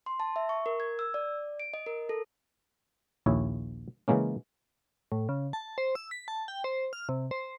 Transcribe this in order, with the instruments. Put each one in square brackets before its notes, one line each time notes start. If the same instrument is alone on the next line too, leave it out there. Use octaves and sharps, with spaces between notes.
[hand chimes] C6
A5
E5
C#6
A#4
G#6
E6
D5
D7
D#5
A#4
A4
[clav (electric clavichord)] A#1 D#2 E4 C#5
C#3 E3 G#3 A#3 C#4
[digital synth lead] A2
C#3
A5
C5
E6
B6
A5
G5
C5
F6
C3
C5